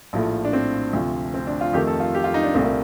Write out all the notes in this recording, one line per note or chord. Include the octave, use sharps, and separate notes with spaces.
A#1 A2 F3 A3
D4
C4
D2 C3 F3
C4
D4
F4
F2 D#3 A3 G4
A4
F4
G4
F4
D#4
D4
C2 A#2 A3 C4
A#3